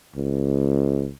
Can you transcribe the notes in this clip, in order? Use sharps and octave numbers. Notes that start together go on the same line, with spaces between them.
C#2